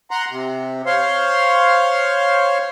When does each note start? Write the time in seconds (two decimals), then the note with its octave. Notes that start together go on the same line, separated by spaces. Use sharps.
0.11 F#5 A#5 C6
0.31 C3
0.86 C5 C#5 F5 C6